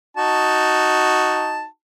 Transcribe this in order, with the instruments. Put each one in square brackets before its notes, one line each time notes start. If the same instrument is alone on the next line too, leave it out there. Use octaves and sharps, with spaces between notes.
[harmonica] D#4 F#4 A5